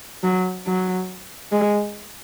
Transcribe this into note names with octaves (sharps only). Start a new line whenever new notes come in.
F#3
F#3
G#3